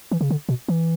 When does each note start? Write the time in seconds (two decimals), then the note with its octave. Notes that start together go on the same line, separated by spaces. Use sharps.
0.11 E3
0.21 C#3
0.30 D3
0.49 B2
0.68 E3